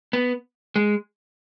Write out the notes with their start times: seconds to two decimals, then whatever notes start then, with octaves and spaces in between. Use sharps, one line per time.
0.13 B3
0.76 G#3